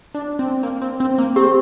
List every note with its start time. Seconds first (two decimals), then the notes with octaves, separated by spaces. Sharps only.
0.14 D4
0.39 C4
0.63 A#3
0.82 C4
1.00 C4
1.18 A#3
1.36 C4 G4